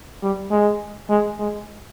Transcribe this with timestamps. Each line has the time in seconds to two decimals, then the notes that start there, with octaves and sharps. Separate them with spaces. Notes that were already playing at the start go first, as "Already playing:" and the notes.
0.22 G3
0.51 G#3
1.09 G#3
1.39 G#3